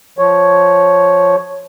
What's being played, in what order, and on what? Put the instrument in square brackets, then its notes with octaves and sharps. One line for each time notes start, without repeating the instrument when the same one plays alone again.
[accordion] F3 C#5